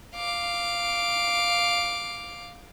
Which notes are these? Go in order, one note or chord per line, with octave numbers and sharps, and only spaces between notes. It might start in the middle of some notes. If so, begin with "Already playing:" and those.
F5 D6